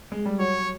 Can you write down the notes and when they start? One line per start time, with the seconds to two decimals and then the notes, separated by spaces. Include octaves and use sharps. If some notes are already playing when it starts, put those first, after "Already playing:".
0.12 G#3
0.26 G3
0.39 F#3 C#5